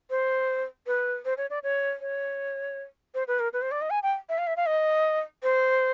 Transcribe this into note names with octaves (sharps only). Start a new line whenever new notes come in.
C5
B4
C5
C#5
D5
C#5
C#5
C5
B4
A#4
B4
C5
D5
D#5
G#5
G5
E5
F5
E5
F5
D#5
C5